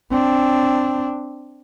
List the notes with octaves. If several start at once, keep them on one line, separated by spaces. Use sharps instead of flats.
C4 D4